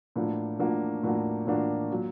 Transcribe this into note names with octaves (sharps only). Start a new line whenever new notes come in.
A2 F3 A#3 D4 F#4
A2 F3 A#3 D4 F#4
A2 F3 A#3 D4 F#4
A2 F3 A#3 D4 F#4
A#2 F#3